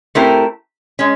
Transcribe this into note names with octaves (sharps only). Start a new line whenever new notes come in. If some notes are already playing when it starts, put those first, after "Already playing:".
A3 C4 E4 G4 A#4
G#3 C#4